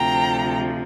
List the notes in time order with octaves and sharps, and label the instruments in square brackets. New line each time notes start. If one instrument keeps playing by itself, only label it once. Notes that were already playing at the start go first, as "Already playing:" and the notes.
Already playing: [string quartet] D2 C3 F3 G5 A#5